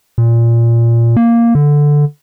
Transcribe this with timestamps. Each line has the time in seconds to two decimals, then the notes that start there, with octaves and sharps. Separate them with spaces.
0.18 A#2
1.16 A#3
1.55 D3